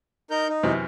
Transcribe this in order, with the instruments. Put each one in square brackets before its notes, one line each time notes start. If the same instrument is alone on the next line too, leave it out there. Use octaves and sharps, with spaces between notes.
[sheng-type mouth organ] D#4 A#4 G6
D#4
[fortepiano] F#2 C3 E3